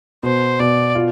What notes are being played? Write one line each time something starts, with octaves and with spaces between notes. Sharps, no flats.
B2 C5
B2 D5
F4